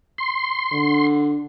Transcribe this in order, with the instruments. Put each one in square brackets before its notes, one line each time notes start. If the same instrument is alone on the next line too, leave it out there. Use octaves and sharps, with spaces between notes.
[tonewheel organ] C6
[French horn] D3